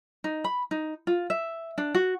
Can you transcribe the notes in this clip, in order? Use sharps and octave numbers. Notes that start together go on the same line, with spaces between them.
D#4
B5
D#4
F4
E5
D4
F#4